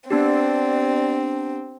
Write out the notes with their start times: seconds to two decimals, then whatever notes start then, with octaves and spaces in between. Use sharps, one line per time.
0.10 B3 C4 D4 G4 D5